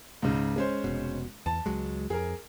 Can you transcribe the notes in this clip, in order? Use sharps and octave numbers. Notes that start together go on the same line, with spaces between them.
C#2 G#2 C#3
G#3 C#4 C5
F1 B2
E2 A5
C#2 F#3 G#3
F2 G#4 A#4